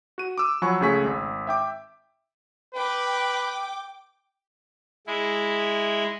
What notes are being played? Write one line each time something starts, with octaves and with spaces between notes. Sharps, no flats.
F#4 D#7
D6 E6
F3 F#3 F#5 G#5 B5 C#6
C#2 C#3 A3 G#4 C#6 B6
G#1
E5 G5 D6
B4 G5 D6
G#3 E4